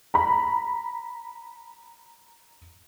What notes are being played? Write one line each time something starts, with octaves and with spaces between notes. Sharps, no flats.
A#5 B5